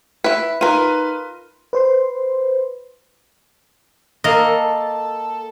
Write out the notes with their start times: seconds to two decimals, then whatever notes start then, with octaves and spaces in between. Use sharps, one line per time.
0.24 E4 B4
0.61 D#4 F4 A#4 B4 D#7
1.73 B4 C5 C6
4.24 A#3 A4 D#5